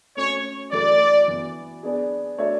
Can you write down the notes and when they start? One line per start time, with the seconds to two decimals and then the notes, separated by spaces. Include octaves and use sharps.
0.17 A3 C#4 F#4 C#5
0.72 E3 A3 D4 F#4 B4 D5
1.28 E3 B3 F#4
1.83 B3 D4 G#4
2.38 A3 D4 F#4 C#5 E5